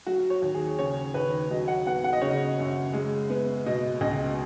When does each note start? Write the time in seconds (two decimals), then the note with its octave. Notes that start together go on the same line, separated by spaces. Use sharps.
0.07 F#3 F#4
0.30 C#5
0.42 D#2
0.54 G#4
0.79 C#3 C#5
1.14 D#2 B4
1.51 F#3 D#5
1.68 F#5
1.87 B3 F#5
2.04 F#5
2.13 D#5
2.21 C#3 C#5
2.30 D#5
2.59 F#2
2.94 G#3
3.30 B3
3.66 B2 D#5
4.01 C#2 D#5